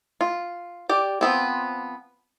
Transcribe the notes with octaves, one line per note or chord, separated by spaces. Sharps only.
F4
G4 D5
F3 B3 C4